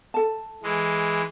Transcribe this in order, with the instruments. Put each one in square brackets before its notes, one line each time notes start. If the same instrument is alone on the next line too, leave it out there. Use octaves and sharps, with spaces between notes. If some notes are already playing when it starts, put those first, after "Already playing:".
[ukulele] A4 A5
[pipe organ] E3 G#3